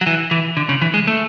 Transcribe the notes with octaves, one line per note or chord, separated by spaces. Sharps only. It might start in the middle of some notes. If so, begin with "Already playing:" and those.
F#3
E3
E3
D3
C#3
E3
G#3
A3